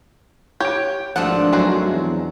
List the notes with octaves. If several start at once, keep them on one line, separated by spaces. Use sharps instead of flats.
G4 C#5 G6 D7
G#1 G2 F3 A3 C4 D4 F#5
F#3 G#3 F#4 C5
E2